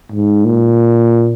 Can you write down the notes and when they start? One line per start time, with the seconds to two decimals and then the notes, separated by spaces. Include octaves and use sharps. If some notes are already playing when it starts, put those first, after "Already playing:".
0.12 G#2
0.45 A#2